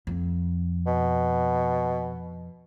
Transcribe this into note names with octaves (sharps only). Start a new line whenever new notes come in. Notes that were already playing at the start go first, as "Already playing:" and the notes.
F2
B2